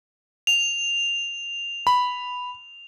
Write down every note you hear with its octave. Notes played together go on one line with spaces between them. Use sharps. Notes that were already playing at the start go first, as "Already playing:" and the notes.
F7
B5